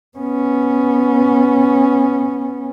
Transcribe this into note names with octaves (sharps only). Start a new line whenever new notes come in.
B3 C#4